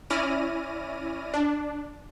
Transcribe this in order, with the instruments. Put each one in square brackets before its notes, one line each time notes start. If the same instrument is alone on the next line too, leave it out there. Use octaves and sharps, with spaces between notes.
[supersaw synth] C#4 E4 D5 F6 A#6 D#7
D4